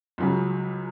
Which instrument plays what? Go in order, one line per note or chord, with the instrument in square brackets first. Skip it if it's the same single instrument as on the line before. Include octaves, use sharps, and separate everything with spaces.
[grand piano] C#2 C#3 F#3